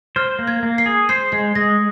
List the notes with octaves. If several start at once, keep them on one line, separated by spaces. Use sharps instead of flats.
C5 F6
A#3
G#6
A#3
C7
G#4
C5 C7
G#3 C7
G#3 A#6